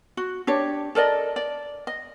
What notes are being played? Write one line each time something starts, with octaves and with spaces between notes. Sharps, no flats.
F#4
D4 G4 C#5
A4 A#4 D5 D#5
D5
D#5